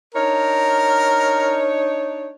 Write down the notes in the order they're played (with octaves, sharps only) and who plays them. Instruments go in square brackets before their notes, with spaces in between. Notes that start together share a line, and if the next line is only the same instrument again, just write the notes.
[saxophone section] D4 D#4 C#5 [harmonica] A#4